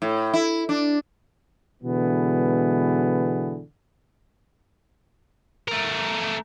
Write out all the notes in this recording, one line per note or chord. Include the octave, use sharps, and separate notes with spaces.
A2
E4
D4
B2 D3 E3 G#3 B3
A3 A#4